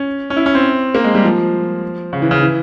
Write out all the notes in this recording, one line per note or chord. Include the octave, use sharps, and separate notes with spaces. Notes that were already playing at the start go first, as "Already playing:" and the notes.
Already playing: C#4
C#4
E4
C#4
C4
A#3
G#3
G3
F3
C#3
E3
C#3
E3